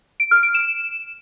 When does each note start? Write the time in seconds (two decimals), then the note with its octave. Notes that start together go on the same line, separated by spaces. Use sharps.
0.20 D7
0.31 F6
0.43 D7
0.54 E7